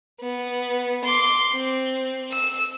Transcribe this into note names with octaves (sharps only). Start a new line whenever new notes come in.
B3
C6 D6
C4
E6